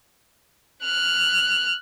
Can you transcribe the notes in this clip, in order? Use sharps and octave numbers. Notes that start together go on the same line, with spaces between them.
F6 F#6